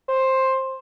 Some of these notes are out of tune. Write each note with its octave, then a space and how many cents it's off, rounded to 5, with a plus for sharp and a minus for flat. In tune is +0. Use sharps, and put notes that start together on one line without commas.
C5 +10